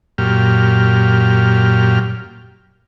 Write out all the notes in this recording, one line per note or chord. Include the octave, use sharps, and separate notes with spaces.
F#2 A#2 G4 F6